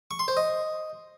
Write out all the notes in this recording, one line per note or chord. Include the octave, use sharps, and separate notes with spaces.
C#6
C6
C5
D#5